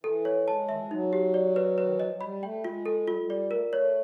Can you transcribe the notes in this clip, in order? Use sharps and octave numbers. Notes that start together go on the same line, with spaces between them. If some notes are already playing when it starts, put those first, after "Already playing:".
E3 A4
C#5
G#3 A5
D#3 E5
E3
F3
F#3 D#4
G4
D5
B4
B4
D#3
E3
F3 D#5
F#3
G3 B5
A3 G5
G#3 F4
A4
G3 F4
G#3
G3
D5
A3 A#4
A3 C#5